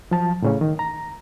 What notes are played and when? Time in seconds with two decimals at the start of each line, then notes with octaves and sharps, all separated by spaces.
0.11 F3 F#3 A5
0.42 A2 C#3 C#4
0.61 D#3
0.79 A#5